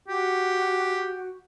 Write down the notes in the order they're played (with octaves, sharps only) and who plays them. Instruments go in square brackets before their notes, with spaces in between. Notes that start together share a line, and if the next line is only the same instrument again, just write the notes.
[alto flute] F#4 [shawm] G4